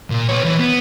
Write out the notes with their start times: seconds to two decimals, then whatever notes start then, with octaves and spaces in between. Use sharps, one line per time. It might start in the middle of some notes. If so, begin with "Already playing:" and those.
0.10 A#2
0.29 B3 C#5
0.44 E3
0.59 B3